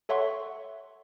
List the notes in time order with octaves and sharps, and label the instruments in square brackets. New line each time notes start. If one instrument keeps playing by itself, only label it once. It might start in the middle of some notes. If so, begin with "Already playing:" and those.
[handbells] A4 C#5 E5 F#5 C6 C#6